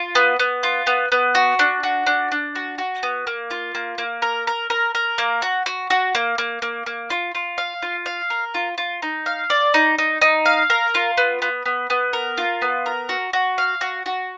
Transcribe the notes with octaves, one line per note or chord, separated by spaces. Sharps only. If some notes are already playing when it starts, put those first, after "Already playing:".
Already playing: F4
B3
B3
F4
B3
B3
F#4
D4
F#4
D4
D4
F#4
F#4
B3
A#3
F4
A#3
A#3
A#4
A#4
A#4
A#4
A#3
F#4
F#4
F#4
A#3
A#3
A#3
A#3
F4
F4
F5
F4
F5
A#4
F4
F4
D#4
F5
D5
D#4
D#4
D#4
F5
A#4
F4
B3
B3
B3
B3
A#4
F4
B3
A#4
F#4
F#4
F5
F#4
F#4